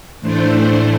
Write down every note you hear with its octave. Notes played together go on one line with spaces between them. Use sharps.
A2 E3 A3 D4 C5
C5